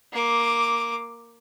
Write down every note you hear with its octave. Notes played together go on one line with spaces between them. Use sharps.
A#3 D6